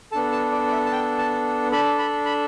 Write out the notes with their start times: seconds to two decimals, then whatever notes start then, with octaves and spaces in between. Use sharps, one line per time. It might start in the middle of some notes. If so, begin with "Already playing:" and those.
0.12 A4 A5
0.15 B3 D4
0.32 A5
0.52 D5
0.67 D5
0.72 E5
0.86 A5
0.92 G5
1.18 A5
1.72 D4 A4 B5
1.99 B5
2.25 B5